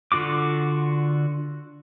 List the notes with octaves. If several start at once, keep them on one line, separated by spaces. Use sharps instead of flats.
D3 F4 F#4 D6